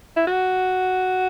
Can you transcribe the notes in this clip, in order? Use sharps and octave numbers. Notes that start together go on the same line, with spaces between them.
E4
F#4